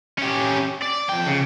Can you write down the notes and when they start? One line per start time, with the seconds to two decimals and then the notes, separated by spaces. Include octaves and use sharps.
0.18 C#4 G4
0.82 D5
1.09 F2 G5
1.27 C#3